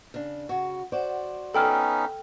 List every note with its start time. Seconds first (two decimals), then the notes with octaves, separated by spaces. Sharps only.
0.14 C#3 D4
0.49 C#3 F#4
0.92 F#4 C5 D5
1.54 B3 C#4 D#4 A4 G5 F6